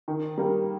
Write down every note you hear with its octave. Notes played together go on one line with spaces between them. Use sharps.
D#3
G3 A#3